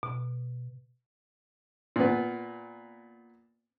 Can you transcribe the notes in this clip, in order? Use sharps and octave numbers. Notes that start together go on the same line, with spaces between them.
B2
A#2 B3